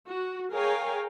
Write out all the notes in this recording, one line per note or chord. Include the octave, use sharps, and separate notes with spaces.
F#4
G#4 A#4 C#5 F5 G5 G#5